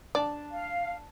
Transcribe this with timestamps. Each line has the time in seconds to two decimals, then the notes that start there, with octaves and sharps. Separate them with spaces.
0.15 D4 D5 A5
0.52 F5